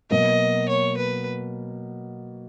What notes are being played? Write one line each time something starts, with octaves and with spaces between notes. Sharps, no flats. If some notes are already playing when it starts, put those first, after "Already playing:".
B2 F#3 A#3 D#5
C#5
B4